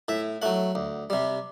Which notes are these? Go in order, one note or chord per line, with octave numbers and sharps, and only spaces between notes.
A2 E5
F#3 A3 F#5
D2
C3 G3